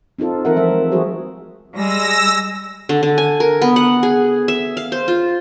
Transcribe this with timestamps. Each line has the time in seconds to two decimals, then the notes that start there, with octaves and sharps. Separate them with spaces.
0.19 C4 D#4 F4 A4
0.45 E3 C4 F4 A#4 E5 F#5
0.56 F3 A3 E5
0.70 G#3
0.92 F3 F#3 F#4 G#4 C5
1.74 G3 G#3 E6 A#6
2.89 D3
3.03 D3
3.18 G#5
3.40 A#4
3.62 B3
3.76 F#5
4.03 G#4
4.48 E5
4.77 F5
4.92 C5
5.08 F4